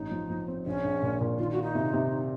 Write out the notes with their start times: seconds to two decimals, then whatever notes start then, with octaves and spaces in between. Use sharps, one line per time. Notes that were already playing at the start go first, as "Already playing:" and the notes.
Already playing: A1 D#4
0.12 F3
0.30 F3
0.48 C4
0.66 A#1 C#4
0.84 A#1
1.03 A#2
1.21 A#2
1.38 D#3 F4
1.51 F#4
1.57 F4
1.62 D#4
1.75 C3
1.93 C3